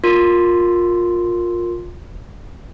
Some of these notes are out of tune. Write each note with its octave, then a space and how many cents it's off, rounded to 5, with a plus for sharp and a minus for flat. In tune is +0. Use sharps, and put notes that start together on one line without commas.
F4 +20 A#4 +0 C6 +0